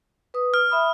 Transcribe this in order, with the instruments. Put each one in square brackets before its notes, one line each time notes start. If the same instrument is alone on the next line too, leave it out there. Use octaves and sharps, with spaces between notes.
[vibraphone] B4 D#6
[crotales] F6
[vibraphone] E5 B5 D#6